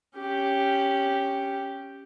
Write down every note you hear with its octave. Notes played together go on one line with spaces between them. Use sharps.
C#4 G4